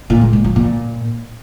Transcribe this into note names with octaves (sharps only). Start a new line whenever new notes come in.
A#2
G#3
A#2
F3
A#2